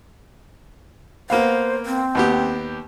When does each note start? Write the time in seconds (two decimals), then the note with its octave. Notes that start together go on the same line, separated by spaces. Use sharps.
1.30 A#3 B3 C5 F5
1.86 C4
2.15 D#2 B3 G4